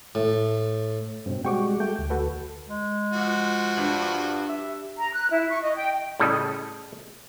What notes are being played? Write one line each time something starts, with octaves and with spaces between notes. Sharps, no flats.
A2
G2 B2 C4
G3 G#3 F#4 G5 C#6 D6
A3 G5
D2
F#4 A4 B4
G#3
F3 F#4
G2
E5
A#5
F#6
E4
C#6
D#5
G5
A2 C#3 G3 A4 D#5